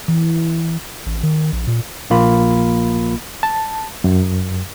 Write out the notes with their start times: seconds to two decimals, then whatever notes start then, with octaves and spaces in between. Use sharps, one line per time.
0.08 E3
1.06 A1
1.23 D#3
1.52 A#1
1.67 A#2
2.10 A#1 A#3 F4 B5
3.43 A5
4.04 F#2